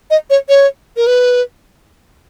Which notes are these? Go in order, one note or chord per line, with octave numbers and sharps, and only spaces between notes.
D#5
C#5
C#5
A#4
B4